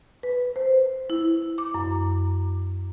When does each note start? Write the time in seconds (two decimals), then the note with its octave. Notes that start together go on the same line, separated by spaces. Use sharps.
0.23 B4
0.56 C5
1.10 E4
1.58 D6
1.74 F#2